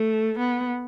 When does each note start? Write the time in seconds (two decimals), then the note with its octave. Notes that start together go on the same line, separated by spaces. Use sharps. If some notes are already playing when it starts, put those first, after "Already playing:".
Already playing: A3
0.39 B3